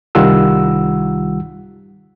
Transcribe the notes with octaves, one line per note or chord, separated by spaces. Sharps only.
C2 D#3 G3 F4 F#5 E6